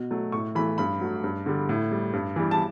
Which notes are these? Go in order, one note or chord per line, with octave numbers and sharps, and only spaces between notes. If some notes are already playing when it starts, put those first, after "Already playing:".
Already playing: B2
F#3 A3
A2 C#6
E3 A3 B5
G2 B5
F#3 A3
G2
D3 G3
A2
G3
G2
E3 G3
A5